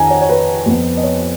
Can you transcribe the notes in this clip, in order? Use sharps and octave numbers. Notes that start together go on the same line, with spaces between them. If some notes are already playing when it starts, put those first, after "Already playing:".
Already playing: F2 D#3 F#5 G#5 A#5
C#5
C#5
B4
F2 F3 B3
D#5
C#5